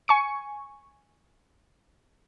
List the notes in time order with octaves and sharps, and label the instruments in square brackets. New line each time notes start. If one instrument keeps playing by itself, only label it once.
[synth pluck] G#5 C#6 C#7